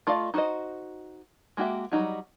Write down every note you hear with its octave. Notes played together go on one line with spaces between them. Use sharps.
A3 F4 D5 D#5 F5
D#4 F#4 B4 C5 D#5
G#3 A#3 F#4 G4 E5
F#3 G3 D#4 F#4